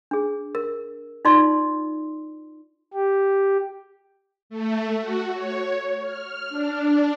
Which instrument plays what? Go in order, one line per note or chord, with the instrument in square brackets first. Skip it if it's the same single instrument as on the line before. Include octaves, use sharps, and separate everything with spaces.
[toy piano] D4 G#4
A#4
D#4 F4 D5 C6
[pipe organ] G4
[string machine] A3
F#4
C#5
F6
D4